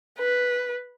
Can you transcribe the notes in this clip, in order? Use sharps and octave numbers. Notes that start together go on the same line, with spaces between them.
B4